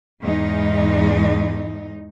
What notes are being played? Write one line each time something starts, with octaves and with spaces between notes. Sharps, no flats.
E2 G#2 G#3 D#4